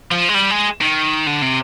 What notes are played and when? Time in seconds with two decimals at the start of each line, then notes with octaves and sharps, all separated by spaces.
0.11 F3
0.29 G#3
0.34 G3
0.51 G#3
0.81 D#3
1.27 D3
1.42 C3